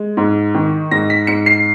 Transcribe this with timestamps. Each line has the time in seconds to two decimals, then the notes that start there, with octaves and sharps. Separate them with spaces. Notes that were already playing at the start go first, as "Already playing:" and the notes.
Already playing: G#3
0.17 G#2
0.54 D#3
0.91 G#2 A#6
1.10 B6
1.27 G#2 C#7
1.46 C7